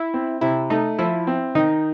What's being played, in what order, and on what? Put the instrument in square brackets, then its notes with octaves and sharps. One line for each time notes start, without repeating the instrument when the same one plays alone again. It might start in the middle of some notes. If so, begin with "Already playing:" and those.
Already playing: [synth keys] E4
[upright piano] C4
[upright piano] C3 [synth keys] E4
[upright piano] A3 [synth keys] D#4
[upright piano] F3 [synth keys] E4
[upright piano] C4
[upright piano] D#3 [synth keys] D#4